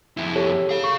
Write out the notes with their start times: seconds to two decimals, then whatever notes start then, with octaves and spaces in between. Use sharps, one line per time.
0.17 F2 E4
0.35 G4 A4 C#5
0.69 G#4 F5
0.84 C#6